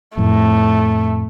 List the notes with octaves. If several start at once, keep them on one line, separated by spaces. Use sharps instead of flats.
F2 A2 A3